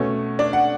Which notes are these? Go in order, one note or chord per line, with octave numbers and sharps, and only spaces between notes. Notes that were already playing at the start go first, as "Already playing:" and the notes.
Already playing: B2 A3 C#4
D4 D5
F#5